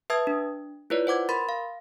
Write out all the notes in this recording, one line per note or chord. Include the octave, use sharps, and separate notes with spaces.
B4 E5 A5 D#6 G#6
D4
E4 F4 B4 C#5 D5
C5 F#5 D6 G#6
A#4 B5 C6 A6
F5